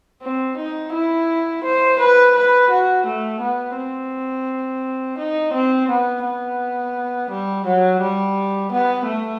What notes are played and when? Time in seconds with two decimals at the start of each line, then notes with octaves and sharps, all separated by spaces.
0.22 C4
0.58 D#4
0.93 E4
1.63 C5
1.99 B4
2.35 B4
2.70 F#4
3.05 A3
3.40 B3
3.76 C4
5.18 D#4
5.53 C4
5.89 B3
6.24 B3
7.30 G3
7.65 F#3
8.01 G3
8.72 B3
9.07 A3